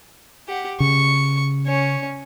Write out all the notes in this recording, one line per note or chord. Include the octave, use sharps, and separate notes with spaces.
G4 F#5
C#3 C#6
C#4 C#5